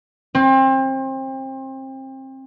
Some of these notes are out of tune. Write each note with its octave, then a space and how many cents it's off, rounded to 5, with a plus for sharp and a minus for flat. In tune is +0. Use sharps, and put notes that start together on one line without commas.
C4 +30